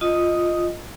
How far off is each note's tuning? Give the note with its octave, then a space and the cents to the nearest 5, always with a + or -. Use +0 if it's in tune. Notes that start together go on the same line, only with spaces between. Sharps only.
F4 +0 D#5 +0 D#6 +0